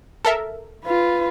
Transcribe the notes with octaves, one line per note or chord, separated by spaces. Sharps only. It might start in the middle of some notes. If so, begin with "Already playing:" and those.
A4 A#4 E5
F4 B4